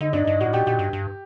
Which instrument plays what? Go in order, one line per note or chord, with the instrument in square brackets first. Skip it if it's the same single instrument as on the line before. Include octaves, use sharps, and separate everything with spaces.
[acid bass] D3 [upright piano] D#4
[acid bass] G2 [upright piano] D4
[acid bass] G2 [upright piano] D#4
[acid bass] A2 [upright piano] F#4
[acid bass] A#2 [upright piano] G4
[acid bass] A#2 [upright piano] G4
[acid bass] G2
G2